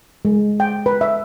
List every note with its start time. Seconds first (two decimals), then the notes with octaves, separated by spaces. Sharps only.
0.25 G#3
0.60 G5
0.86 B4
1.01 E5